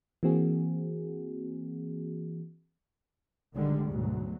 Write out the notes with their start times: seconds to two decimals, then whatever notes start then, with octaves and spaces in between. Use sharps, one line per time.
0.23 E3 A#3 C4 F#4 G#4
3.54 A#1 D3 D#3 G3 G#3
3.87 D2 G#2 B2 F#3